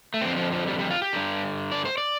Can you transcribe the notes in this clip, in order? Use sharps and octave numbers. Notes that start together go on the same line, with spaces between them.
A3
F2 D3 C4
F3
F3
G3
G3
F4
G4
G2 D3
D5
C5
D5